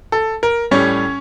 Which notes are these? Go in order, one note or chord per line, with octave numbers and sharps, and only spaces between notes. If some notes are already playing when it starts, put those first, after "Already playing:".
A4
A#4
A2 G3 C#4 C#5